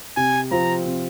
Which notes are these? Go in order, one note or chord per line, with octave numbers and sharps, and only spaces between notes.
C3 G#5
F3 C4 F4 A#5
C3